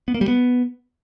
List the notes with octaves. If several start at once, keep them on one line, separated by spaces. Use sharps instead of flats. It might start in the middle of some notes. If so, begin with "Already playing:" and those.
B3
A#3
G3
B3